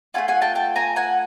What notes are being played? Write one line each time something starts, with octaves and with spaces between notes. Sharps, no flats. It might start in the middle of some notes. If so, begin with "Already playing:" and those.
A3 C#4 F4 F#5 G#5
F#5 G#5
G5 A5
G5 A5
G#5 A#5
F#5 G#5